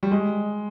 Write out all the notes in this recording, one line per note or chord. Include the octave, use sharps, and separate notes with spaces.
G3
G#3